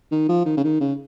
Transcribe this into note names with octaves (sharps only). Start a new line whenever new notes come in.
D#3
F3
D#3
C#3
D#3
C#3